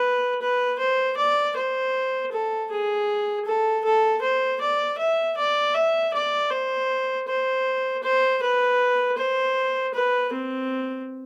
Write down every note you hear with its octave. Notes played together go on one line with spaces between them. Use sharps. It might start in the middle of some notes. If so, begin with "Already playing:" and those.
Already playing: B4
B4
C5
D5
C5
A4
G#4
A4
A4
C5
D5
E5
D5
E5
D5
C5
C5
C5
B4
C5
B4
C4